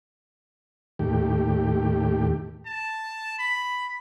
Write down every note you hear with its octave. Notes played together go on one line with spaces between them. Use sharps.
D#2 A2 G4
A5
B5